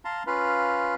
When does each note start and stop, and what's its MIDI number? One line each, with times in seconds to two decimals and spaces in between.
0.05 0.23 77
0.05 0.23 81
0.05 0.23 82
0.05 0.23 84
0.27 0.95 61
0.27 0.95 65
0.27 0.95 71
0.27 0.95 77